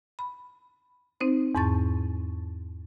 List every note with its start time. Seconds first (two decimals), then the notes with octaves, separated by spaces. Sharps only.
0.19 B5
1.20 C4 D#4 C5
1.55 E2 G#2 A5 C#6 A6